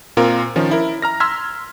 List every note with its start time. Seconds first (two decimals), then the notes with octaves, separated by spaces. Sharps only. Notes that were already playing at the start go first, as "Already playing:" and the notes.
0.17 A#2 C4 F4 A#4
0.56 D#3 F3 C#4
0.71 E4 A#4
1.02 A#5 F6 A#6
1.20 C6 E6 F6 G#6 B6